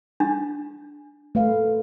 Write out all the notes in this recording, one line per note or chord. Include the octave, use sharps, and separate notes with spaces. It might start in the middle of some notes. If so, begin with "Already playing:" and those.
D4
A3 B4 F5